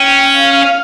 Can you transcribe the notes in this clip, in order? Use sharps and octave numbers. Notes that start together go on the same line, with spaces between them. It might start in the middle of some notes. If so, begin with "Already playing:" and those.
Already playing: C#4 G5
F5